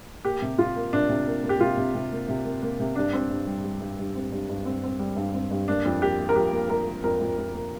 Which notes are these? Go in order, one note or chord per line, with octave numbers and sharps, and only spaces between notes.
A#3 G4
C3
C3 F4
A#3
C3 D4
C3
A#3
A#3
G4
C3 F4
C3
C3
A#3
C3
A#3
A#3
C3
G2 D4
C4
G2
G3
G3
G2
G2
C4
G2
G2
C4
C4
G3
G2
C4
G2
A#3 D4
F2
A#3 G4
A#3
A#4
F3 G4
A#3
A#3 A#4
A#3
F2 A#4
F2
F2
A#3